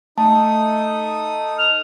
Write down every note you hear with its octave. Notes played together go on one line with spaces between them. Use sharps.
A3 D#4 A5 D#6
F6